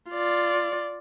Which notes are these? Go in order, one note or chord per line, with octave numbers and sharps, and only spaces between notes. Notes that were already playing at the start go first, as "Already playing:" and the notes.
F4 D5